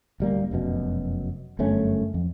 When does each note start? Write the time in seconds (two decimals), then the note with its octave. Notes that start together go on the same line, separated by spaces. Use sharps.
0.20 D1 G3 A#3
0.51 F1 F#2 B2
1.59 G1 F#2 A3 C#4
2.14 F2